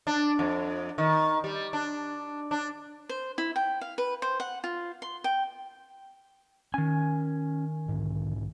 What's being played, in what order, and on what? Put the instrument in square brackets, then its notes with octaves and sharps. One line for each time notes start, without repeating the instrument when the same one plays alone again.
[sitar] D4
F2
D#3
G3
D4
D4
[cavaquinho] C5
E4
G5
F5
B4
C5
F#5
F4
C6
G5
[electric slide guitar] D#3 G#5 [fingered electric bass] C#4
[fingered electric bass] B1 G#2